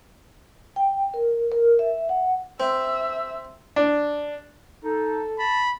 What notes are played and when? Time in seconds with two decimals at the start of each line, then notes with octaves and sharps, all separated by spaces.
0.76 G5
1.14 A#4
1.52 A#4
1.79 E5
2.09 F#5
2.60 C4 E5 E6
3.76 D4
4.84 D#4 A4
5.39 A5 B5